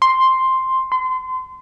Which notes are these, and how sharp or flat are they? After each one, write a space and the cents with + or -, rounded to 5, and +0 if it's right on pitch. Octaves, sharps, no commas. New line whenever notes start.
C6 +5
C6 -30